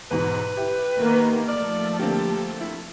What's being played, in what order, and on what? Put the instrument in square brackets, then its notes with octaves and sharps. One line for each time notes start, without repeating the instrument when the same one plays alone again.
[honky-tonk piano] E2 G#2 B2 [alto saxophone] B4
[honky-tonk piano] E4 G4
[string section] D#3 A#3 B3
[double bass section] F3 A3 [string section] A4 [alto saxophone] D5 [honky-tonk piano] F6
[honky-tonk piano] D3 A#3 C4 [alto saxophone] G4
[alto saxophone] E4